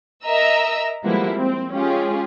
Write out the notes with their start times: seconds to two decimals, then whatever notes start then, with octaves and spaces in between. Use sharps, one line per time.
0.25 A#4 D#5 E5 A#5 E6
1.04 F3 G3 G#3 A#3 B3 E4
1.34 C4
1.72 G#3 C#4 F4 G4 G#4